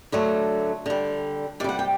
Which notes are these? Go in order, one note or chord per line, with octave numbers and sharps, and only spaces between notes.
D3 F#3 A3
D3 G3
C3 G3 D5 F#5
G5